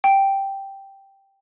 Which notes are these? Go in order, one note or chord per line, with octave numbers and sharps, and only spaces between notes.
G5